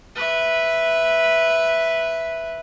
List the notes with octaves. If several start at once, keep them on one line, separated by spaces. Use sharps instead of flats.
B4 E5